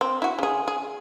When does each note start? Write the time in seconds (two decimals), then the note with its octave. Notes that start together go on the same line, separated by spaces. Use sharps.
0.01 C4
0.22 E4 F#4
0.39 C#3 G#4
0.68 G#4